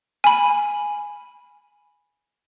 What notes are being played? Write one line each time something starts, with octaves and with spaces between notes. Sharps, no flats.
G#5 B5